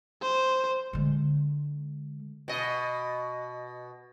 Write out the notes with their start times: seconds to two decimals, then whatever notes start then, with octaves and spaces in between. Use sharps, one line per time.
0.22 C5
0.93 D3 G#3
2.48 B2 D#5